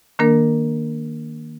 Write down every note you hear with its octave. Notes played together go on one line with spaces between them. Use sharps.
D#3 A#3 D4 A#4